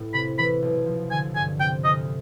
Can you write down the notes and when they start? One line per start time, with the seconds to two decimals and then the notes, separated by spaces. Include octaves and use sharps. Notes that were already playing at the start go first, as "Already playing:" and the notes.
Already playing: A2
0.13 C3 B5
0.38 E3 B5
0.62 B1
0.86 F3
1.11 D3 G#5
1.36 G2 G#5
1.59 C3 G5
1.84 D2 D#5